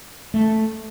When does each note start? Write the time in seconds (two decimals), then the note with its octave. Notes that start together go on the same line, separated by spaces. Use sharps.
0.34 A3